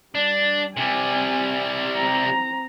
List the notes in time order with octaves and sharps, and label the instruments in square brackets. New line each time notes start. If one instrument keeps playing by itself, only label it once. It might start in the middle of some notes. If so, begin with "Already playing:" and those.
[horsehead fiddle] G3 [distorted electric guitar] D4
[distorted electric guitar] C3 G3 [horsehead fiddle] C4 G#5
[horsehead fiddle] C4 A#5